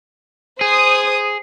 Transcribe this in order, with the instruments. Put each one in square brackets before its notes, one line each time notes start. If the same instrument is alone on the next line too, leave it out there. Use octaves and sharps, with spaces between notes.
[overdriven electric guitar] G#4 [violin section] C5 D#6